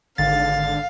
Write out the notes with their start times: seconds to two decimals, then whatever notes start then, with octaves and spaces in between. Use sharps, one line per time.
0.18 G#1 D3 F5 A6